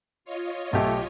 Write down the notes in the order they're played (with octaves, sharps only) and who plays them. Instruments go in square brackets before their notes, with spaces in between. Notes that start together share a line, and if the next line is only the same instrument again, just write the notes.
[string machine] F4 C#5 D#5
[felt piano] B1 G4 [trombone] A3